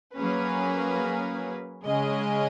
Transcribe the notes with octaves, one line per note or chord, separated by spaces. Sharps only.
F#3 A#3 C#4 G#4 B4
C#3 G#3 C#4 G#4 D#5